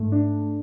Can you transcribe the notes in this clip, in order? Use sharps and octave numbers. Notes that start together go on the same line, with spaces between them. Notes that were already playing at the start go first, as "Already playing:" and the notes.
Already playing: G#2 A3
D4